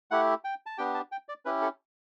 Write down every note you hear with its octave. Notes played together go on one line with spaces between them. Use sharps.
A3 E4 G4 F#5
G5
A5
B3 D4 G4 G5
A5
G5
D5
C#4 E4 G4 B4
A4